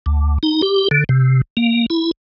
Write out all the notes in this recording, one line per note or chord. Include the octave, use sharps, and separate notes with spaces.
D2
D#4
G4
D3
C3
A#3
E4